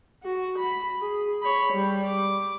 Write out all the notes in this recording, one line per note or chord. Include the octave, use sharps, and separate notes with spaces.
F#4
B5
G#4
C#5 B5
G3
D6